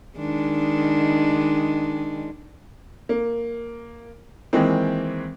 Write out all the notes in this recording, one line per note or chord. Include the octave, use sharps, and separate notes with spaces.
D#3 G#3 D4
A#3
D#3 E3 G#3 A#3 C4